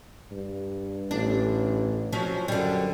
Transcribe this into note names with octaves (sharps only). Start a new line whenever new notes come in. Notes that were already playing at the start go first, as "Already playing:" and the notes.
G2
A1 D4
F3 F#3 C#4
F#2 D3 G3